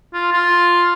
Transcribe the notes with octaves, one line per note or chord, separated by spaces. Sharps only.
F4
F4